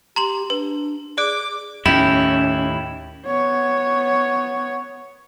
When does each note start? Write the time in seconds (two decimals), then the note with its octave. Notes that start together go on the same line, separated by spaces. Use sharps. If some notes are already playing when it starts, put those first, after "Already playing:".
0.16 G4 A#5 C6 F#7
0.50 D4 B4
1.18 G#4 D5 D6 F#6 D7
1.86 D#2 A2 C#4 E4 G4
3.26 B3 C#5